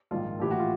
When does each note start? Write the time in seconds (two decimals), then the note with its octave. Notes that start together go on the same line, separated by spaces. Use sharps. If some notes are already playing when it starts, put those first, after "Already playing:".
0.11 A#1 G#2 D#3 F4
0.40 A#1 A2 E3 G4
0.51 F#4
0.59 F4